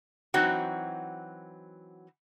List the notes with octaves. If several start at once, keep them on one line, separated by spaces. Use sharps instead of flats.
E3 F#3 C4 D#4 F#4